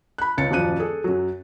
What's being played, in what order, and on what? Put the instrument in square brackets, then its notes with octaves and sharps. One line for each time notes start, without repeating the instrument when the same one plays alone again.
[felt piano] B5 F#6
C#2 C#4 A6 C#7
D#1 F#2 F3 F#6 D#7
G#4 A4
F#2 F#3